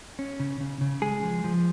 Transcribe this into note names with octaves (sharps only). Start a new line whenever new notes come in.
C#4
C#3
C#3
C#3
G#3 G#4
F3
F3